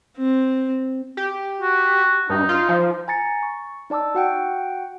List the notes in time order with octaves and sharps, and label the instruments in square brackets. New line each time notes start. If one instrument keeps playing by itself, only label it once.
[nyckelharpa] C4
[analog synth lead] G4
[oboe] F#4
[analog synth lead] G2 [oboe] D#4
[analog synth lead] F4
F3
[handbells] G#5 A#5 A6 C#7
C#6
D#4 D5 A5 D6 E6
F#4 F#5 G5